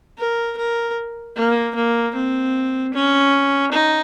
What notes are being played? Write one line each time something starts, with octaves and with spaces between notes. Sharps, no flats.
A#4
A#4
A#3
A#3
C4
C#4
D#4